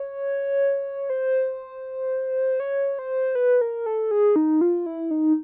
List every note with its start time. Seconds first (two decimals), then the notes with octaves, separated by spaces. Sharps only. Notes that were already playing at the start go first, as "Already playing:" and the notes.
Already playing: C#5
1.10 C5
2.60 C#5
2.99 C5
3.35 B4
3.61 A#4
3.86 A4
4.11 G#4
4.36 D#4
4.61 F4
4.86 E4
5.11 D#4